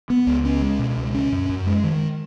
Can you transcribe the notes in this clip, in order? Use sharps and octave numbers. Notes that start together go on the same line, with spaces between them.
B3
C#2
C#4
G#3
B2
C#2
C#4
F#2
F#2
G#3
D#3